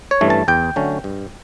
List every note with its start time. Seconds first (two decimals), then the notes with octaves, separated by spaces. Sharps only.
0.11 C#5
0.21 G2 E3 A3 C#4
0.30 A5
0.48 E2 G5
0.76 D3 F#3 A3 C#4
1.04 G2